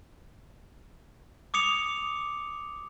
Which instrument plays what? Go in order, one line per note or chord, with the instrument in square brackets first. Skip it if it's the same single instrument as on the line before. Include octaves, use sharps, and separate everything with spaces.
[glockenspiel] D6 D#6 C#7 F7